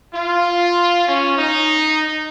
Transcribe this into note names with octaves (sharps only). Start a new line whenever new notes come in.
F4
C#4
D#4